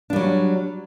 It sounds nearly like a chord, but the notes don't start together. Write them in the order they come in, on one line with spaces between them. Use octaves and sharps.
D4 G3 F#3